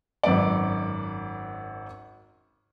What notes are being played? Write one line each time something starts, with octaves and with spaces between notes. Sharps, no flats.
G#1 F#2 B4 D5